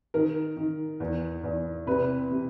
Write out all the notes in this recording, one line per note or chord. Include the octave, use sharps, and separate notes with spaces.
D#3 A#4
D#3
E2
E2
C3 B4
C3